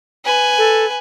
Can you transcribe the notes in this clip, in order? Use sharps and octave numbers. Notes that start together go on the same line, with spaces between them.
B4 G#5
A4